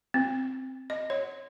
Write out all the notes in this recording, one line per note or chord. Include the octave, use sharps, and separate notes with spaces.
C4
D#5
C#5